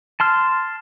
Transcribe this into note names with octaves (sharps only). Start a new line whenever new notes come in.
A5 C6 F6